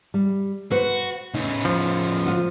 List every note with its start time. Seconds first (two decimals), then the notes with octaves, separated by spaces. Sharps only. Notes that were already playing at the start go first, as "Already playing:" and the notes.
0.14 G3
0.71 F#4 B4 C5
1.34 A2 C#3 D#4
1.65 F3
2.26 F4 F#4